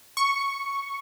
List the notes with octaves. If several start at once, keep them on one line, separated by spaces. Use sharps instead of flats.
C#6